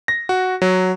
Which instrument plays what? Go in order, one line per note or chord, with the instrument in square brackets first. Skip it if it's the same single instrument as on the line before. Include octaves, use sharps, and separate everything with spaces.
[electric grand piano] A#6
F#4
F#3